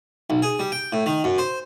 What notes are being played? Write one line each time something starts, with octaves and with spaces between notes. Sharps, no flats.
B1
G#4
G3
G5
A2
D#3
F#2
C5